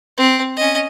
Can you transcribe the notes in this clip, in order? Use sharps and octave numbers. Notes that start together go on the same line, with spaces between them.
C4
C#4 D#5